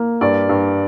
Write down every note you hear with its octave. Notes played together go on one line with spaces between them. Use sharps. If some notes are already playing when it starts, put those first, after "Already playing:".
Already playing: A#3
G2 D5
G2